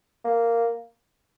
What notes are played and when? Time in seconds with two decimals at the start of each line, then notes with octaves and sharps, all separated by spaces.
0.25 A#3